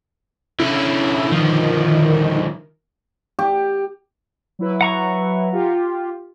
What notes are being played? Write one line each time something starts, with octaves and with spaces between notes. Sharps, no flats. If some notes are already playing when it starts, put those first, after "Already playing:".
D3 C#4 E4
D3 D#3 F3
G4
F#3 E4 B4
F#5 A#5 C#6
F4 G4